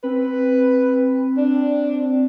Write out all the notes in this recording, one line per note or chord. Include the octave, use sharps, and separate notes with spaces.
C4 B4
D4